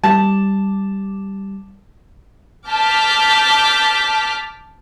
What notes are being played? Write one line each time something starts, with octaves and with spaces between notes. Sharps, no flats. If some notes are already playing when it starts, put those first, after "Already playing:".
G3 A5
A5 D6 F6 G6 B6